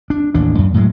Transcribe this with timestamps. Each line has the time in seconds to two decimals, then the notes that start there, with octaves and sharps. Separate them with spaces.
0.10 D4
0.34 A1 D#2 A2 D4
0.58 F#2
0.74 A2 F#3 G#3